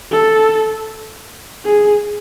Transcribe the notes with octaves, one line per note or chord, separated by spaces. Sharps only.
A4
G#4